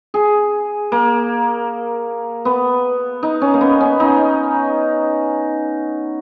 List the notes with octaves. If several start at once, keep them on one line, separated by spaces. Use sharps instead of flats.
G#4
A#3
B3
D#4
C#4
A#3
B3
C#4
D#4